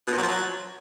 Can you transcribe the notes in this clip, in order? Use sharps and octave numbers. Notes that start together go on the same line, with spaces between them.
B2
A#2
F#3
F3
F#3